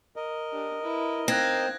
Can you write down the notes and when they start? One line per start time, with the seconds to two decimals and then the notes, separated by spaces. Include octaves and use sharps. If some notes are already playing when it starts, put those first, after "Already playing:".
0.16 A#4 D#5
0.51 D4 G4
0.82 E4 B4
1.28 C4 D#4 F5 F#6 G#6 A#6